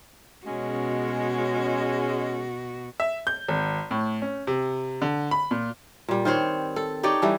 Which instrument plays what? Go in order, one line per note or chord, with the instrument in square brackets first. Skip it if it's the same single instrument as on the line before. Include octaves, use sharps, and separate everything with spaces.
[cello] B2 F#4 [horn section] G#3 C#4
[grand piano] E5
G6
G#1
A2
C#4
C3
D3
B5
A#2
[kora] A#2 G3
D#3 C4 C5 C#5
A4
D#4 G4 C#5 D5
E3 G3 A4